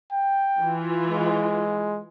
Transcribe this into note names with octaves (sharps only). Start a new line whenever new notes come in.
G5
E3 F4
G#3